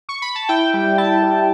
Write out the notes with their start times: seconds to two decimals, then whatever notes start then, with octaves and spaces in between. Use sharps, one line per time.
0.09 C#6
0.22 B5
0.35 A5
0.49 E4 G5
0.74 G3
0.98 E4 A5
1.22 G3